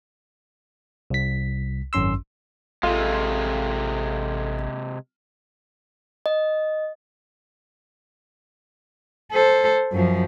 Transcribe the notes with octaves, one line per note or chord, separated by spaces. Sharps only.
C2 B6
G#1 F#2 C#4 C6 E6
A1 C3 G#3 F4 A4
D#5
A4 C5
F#2 F3